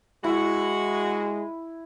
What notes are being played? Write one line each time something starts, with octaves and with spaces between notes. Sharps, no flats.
G#3 E4 F#4